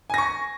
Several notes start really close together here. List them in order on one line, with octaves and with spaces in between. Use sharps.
G#5 A#6 C#6